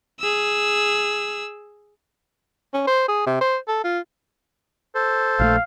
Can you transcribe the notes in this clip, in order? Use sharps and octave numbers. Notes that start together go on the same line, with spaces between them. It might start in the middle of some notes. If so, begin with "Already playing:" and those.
G#4 E6
C#4
C5
G#4
C3
C5
A4
F4
A4 C5
A#1 F3 A3 F5